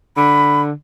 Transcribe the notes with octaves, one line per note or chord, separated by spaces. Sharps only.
D3 B5